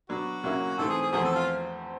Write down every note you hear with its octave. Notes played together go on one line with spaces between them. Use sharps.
F#3 B3 D4 F#4
C#3 F#3 A#3 C#4 E4
G#2 E3 A3 C4 A4
G#4
G#4
E2 C3 F3 A3 C4 G#4
A4
F4